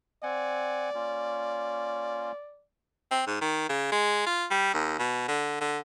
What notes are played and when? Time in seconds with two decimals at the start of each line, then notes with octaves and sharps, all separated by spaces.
0.23 C4 D5 F#5 G#5
0.94 A#3 C#4 F4
3.11 C4
3.27 G#2
3.41 D#3
3.69 C#3
3.92 G#3
4.26 F4
4.51 G3
4.74 D#2
4.99 B2
5.28 D3
5.61 D3